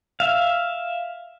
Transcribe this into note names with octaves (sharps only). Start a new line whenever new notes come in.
E5 F5